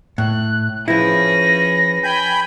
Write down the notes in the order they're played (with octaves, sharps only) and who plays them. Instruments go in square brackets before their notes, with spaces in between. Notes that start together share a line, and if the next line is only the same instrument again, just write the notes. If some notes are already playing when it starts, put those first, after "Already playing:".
[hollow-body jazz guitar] A2 [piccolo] F#6
[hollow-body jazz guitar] F3 E4 [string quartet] C#4 G#4 B4 [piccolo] A#6
[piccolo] G5 [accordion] G#5 B5 G6